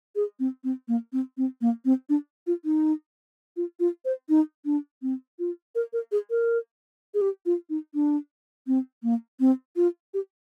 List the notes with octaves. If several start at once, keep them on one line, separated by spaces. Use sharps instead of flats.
G#4
C4
C4
A#3
C4
C4
A#3
C4
D4
F4
D#4
F4
F4
C5
D#4
D4
C4
F4
A#4
A#4
G#4
A#4
G#4
G4
F4
D#4
D4
C4
A#3
C4
F4
G4